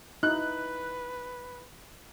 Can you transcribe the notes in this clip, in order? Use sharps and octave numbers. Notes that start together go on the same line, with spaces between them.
D#4 E4 B4 F#6